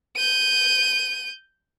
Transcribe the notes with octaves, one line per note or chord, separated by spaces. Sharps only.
G6 D#7